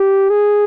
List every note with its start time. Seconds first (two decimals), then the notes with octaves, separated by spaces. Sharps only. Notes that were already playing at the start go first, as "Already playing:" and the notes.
Already playing: G4
0.29 G#4